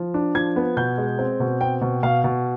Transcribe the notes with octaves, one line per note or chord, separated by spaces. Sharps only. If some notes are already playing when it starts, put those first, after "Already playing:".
Already playing: F3
D4
F3 G#6
B3
B2 G6
G#3
C4
B2
C4 G5
B2
B2 F5
B2